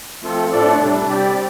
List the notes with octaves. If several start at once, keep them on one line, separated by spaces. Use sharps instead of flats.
F3 A3 C4 F4 A4
A2 A3 D4 A4 D5
C3 G3 D4
G3 C4 G4 D5